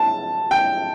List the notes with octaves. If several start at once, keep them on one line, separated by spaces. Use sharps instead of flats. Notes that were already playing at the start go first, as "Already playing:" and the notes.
Already playing: A5
G5